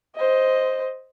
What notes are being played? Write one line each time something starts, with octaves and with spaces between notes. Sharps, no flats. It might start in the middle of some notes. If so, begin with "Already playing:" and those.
C5 D#5